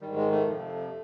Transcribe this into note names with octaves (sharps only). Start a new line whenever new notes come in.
G#2 D#3 G3
G#3
A3
F2 C3 F3